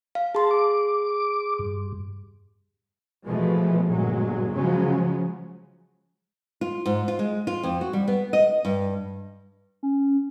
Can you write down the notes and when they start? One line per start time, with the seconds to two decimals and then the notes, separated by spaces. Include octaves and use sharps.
0.15 F5
0.35 G#4 A5 C6
0.51 D6
1.59 G2
3.26 B2 E3 F3 G#3 A3
3.90 G1 A#2 F#3 G#3
4.56 C#3 F3 F#3 G#3 C#4
6.61 F4
6.86 G#2
7.08 F4
7.19 G#3
7.47 F4
7.63 F2
7.81 F#4
7.93 G3
8.08 B3
8.33 D#5
8.65 G2
9.83 C#4